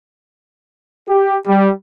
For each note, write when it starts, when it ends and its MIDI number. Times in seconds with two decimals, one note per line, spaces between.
1.08 1.35 67
1.47 1.69 55